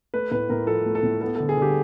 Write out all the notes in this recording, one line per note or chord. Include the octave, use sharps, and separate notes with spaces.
A3 B4
A2 B4
A2 A#4
F3 A4
A3
A4
A2
B3 A4
A4
D3
G#4
D3 G4